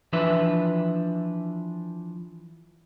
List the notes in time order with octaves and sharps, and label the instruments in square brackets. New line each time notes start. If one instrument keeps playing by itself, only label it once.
[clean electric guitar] E3 F3 D4 B4 E5